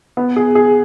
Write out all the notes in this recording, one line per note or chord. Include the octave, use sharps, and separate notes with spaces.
B3
G#4
G#4